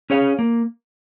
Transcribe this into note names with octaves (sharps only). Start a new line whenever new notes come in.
C#4 G#4 C#5 F5
A#3